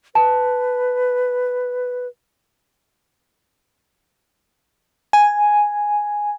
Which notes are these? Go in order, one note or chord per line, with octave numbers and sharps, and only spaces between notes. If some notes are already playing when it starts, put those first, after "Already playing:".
B4 A5
G#5